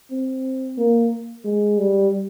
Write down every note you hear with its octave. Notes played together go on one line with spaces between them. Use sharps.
C4
A#3
G#3
G3